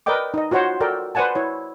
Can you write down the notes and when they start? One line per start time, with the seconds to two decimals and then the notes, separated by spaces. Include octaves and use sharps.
0.06 A#4 B4 D5 D#5 G5 D6
0.34 D#4 D#5
0.51 F4 F#4 C5 C#5 F#5
0.80 F#4 A4 A#4 D5 G5
1.15 B4 C5 D5 F#5 G#5 A5
1.35 E4 C#5